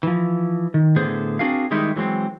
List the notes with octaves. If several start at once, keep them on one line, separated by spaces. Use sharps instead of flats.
E3 F3
D#3
A2 D3 B3 G#4 C5
C4 D4 F#4 G#4 A#4 F5
D#3 G3 G#3 D#4 E4
E3 F#3 G#3 A#3 C4